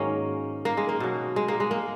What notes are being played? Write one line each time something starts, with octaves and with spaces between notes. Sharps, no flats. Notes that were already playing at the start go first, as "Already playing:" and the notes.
Already playing: G#2 D#3 F#3 A#3 C#4
A#3
G#3
A#3
B2 F#3
G#3
A#3
G#3
A#3